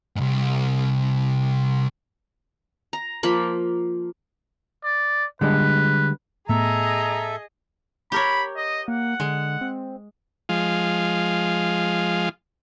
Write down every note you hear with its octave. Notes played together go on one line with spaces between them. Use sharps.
C2 G#2
A#5
F3 A#3 B5
D5
D3 G3 G#3 B4
A2 A3 B3 G#4 A4 D#5 E5 A#5
G4 A#4 C#5 B5
D#5
A#3 F#5
D3 G#3
C4
F3 G#3 F4